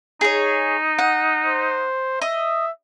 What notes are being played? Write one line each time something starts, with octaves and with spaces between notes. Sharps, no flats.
D#4 G#4 C#5
F#5
C5
D#5 E5